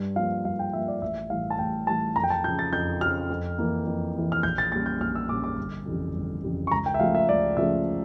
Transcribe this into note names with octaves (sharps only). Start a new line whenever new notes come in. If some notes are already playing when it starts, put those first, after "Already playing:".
Already playing: G2
F3 A#3 F5
G2 F5
G5
F3 A#3 E5
D5
A1 E5
A2 E3 G3 F5
A5
A1 G5
A2 E3 G3 A5
F2 A#5
G5
A5
C#3 F3 G6
A6
F2 G6
C#3 F3 F6
F2
E3 A#3
F2
E3 A#3
F6
A#1 G6
A6
A#2 G3 C#4 A6
G6
A#1 F6
E6
A#2 G3 C#4 D6
D6
G1
F2 C#3 E3 G3
G1
F2 C#3 E3 G3
C#6
C#2 A#5
G5
E5
C#3 F3 A3 F5
E5
C#2 D5
C#3 F3 A3 E5